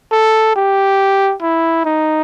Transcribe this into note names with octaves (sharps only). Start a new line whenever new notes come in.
A4
G4
E4
D#4